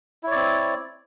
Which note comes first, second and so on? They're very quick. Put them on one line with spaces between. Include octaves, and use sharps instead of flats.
E4 C#5 D5 C4